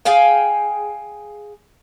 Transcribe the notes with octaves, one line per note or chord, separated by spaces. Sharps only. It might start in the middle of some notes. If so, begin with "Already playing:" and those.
G#4 F5 G5 G#5